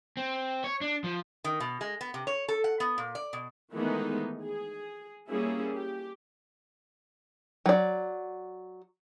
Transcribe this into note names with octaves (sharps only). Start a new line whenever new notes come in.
C4
C#5
D4
F3
D#3
B2
G#3
B3
C3
C#5
A4
F#5
B3
A#2
D5
B2
D#3 E3 G#3 A3 B3 D#4
G#4
G3 A#3 C#4 E4 G#4
G4
F#3 D5